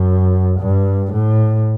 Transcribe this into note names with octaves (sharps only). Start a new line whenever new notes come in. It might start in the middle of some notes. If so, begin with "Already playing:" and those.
Already playing: F#2
G2
A2